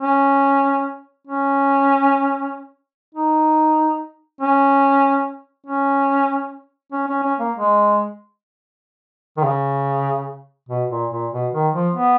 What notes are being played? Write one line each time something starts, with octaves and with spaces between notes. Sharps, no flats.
C#4
C#4
D#4
C#4
C#4
C#4
C#4
C#4
A#3
G#3
D#3
C#3
B2
A#2
A#2
B2
D#3
F3
B3